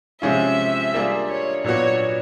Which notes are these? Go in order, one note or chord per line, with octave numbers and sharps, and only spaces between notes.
C3 F3 G#3 C#4 F4 E5
G3 A#3 D4 F4 G#4
C#5
A#2 F#3 B3 D4 F#4 C#5